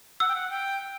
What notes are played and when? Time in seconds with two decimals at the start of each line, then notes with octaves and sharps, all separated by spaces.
0.20 F#5 E6
0.29 G5
0.35 F#5
0.51 G5